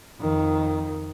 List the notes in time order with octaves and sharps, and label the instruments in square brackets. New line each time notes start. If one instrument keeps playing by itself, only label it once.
[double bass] F2 D#3